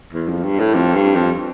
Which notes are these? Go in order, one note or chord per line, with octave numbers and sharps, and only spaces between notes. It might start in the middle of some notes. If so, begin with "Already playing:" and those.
E2
F2
G2
A2
F2
G2
F2